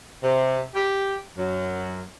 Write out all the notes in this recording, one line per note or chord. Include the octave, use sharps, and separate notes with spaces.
C3
G4
F#2 F#3